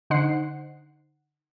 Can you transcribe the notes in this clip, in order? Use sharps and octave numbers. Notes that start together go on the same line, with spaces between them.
D3 D#4 C5 F#5 C7